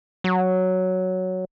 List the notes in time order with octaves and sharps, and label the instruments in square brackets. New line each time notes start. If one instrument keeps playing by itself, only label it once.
[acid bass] F#3